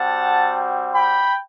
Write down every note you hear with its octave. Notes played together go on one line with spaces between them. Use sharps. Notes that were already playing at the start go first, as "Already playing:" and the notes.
Already playing: G3 C4 F#4 F#5 A5
G5 B5